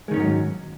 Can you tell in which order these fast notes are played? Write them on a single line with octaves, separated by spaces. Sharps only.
G#3 D#3 C#4 G#2 F#3